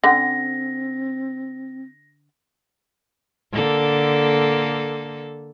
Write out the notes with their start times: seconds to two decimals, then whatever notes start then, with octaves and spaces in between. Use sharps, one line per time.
0.04 D3 C4 C#4 F#5 A#6
3.52 D3 A#3 A4